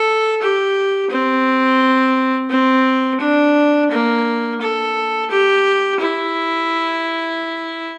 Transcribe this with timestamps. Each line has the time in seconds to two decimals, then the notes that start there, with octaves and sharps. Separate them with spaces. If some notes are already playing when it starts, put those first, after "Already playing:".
Already playing: A4
0.41 G4
1.10 C4
2.50 C4
3.20 D4
3.90 A#3
4.61 A4
5.30 G4
6.00 E4